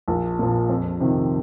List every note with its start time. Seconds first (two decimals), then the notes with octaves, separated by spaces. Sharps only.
0.08 A#1
0.39 A#2 F3
0.69 F2
1.00 C3 D#3